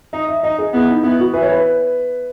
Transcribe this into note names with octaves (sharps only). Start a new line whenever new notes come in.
D#4 D#5
E5
D#4 D#5
G#4
B3 E4
D#4
B3 E4
F#4
E3 B4
C#5
B4